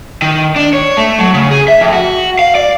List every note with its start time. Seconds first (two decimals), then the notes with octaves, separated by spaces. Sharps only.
0.22 D#3
0.56 D4
0.73 C#5
0.97 A3
1.19 F#3
1.34 C#3
1.51 G#4
1.68 E5
1.80 F2
1.93 F#4
2.39 F5
2.55 D5